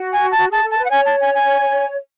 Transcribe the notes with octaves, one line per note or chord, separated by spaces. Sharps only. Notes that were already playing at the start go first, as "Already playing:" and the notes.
Already playing: F#4
G#5
F#4 A5
G#4 A5
A4
A5
B4
F#5
C#5 G#5
A5
G#5
G#5